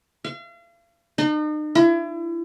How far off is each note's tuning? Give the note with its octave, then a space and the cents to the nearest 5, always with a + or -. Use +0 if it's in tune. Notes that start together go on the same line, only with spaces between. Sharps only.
F5 -40
D#4 -40
E4 +35